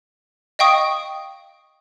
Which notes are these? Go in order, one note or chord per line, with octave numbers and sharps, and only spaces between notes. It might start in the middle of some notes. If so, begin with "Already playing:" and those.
D#5 F5 G5 C#6 D#6